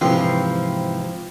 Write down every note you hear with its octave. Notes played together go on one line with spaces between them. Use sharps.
G#2 C3 E3 F3 C4